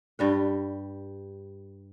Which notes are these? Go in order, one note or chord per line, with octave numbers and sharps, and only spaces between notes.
G2 G3 F#5